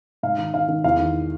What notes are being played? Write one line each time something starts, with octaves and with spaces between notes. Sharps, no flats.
G#2 F5
D#3
D#3 F5
D#3
E2 F5
D#3